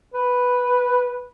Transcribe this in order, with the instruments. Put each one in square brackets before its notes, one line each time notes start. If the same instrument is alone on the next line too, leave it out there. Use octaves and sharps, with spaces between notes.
[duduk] B4